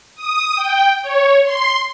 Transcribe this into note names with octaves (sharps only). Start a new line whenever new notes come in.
D#6
G5
C#5
C6